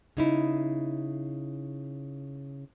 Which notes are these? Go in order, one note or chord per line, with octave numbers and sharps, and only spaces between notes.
C#3 D#4 E4